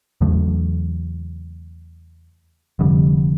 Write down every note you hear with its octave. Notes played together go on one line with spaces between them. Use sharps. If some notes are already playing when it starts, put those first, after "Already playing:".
E2 C#3 F#3 A3
F1 F2 D3 G3